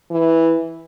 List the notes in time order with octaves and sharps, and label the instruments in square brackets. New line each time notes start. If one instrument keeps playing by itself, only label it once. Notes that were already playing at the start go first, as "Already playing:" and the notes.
[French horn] E3